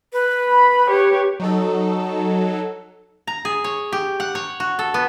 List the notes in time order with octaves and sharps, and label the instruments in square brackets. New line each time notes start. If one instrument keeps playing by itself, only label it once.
[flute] B4
[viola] B5
G4 C#5
[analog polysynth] F#3 D#4 A4
[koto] A#5
G#4
C#5
G4
F#5
C#5
F#4
A4
B3